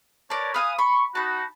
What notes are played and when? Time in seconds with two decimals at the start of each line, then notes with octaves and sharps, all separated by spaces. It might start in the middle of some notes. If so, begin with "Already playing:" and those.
0.30 A#4 B4 C#5 D5 A5
0.54 B4 F5 G#5 D#6
0.79 B5 C#6
1.15 D#4 F#4 A5 B5